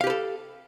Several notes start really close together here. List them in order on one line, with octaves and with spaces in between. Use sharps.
F5 G4 B4 A4